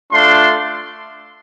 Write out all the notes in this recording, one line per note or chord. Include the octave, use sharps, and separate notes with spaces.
A3 D4 F4 C6